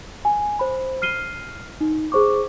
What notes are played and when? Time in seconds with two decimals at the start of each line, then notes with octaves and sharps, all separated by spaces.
0.25 G#5
0.59 C5 B5
1.02 F6 C7 D#7 G7
1.81 D#4
2.12 G#4 C5 C#6 D6